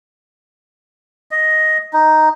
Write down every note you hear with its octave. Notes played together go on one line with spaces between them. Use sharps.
D#5
D#4